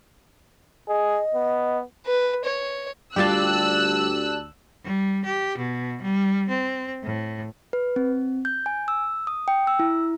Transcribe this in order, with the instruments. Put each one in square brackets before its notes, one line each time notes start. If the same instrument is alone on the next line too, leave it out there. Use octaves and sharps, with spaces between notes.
[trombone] G#4 [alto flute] D#5
[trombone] B3
[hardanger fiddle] B4
C#5
[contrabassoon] D2 [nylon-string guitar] G3 F4 [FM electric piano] G4 D5 A5 [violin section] E6 F#6
[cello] G3
G4
B2
G3
C4
A2
[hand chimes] B4
C4
G6
G#5
E6
D#6
G5
E6
E4